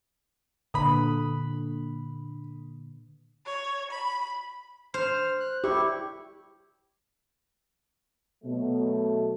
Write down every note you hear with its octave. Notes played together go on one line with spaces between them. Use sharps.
A#2 D3 B4 B5 D#6
C#5
B5
C5 F6
F#6
E4 G4 C#6
B2 F#3 A3